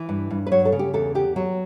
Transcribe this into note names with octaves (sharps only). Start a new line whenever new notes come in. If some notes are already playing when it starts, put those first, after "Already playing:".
Already playing: E3
G2
G2
B4
F#3 C#5
A4
C#3
G4
E2 A4
B3 G4
F#3 F#4